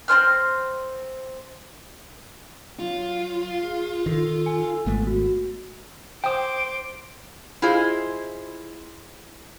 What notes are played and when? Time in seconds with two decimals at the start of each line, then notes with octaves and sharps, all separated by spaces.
0.08 C4 D4 C5 F6
2.79 F#3 F4
3.62 G#4
4.06 D#3 A4
4.46 G#5
4.86 G#1 G#3 A3 B3
5.07 F#4
6.24 C5 G5 C6 D6 D#6
7.62 E4 F4 G#4 C5 D#5